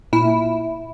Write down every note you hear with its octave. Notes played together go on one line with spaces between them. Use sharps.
A#2 E4